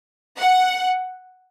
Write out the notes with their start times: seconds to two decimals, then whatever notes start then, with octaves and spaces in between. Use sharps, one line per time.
0.38 F#5